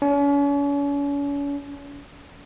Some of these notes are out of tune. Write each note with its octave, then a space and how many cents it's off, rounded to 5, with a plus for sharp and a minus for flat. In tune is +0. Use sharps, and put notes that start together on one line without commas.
C#4 +40